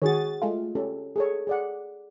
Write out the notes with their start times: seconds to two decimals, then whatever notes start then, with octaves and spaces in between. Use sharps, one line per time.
0.02 D#3 F#4 G#4 C#5 A6
0.42 G#3 A3 F4
0.75 C#4 G4 A4
1.16 G#4 A4 C#5
1.47 G#4 D5 F#5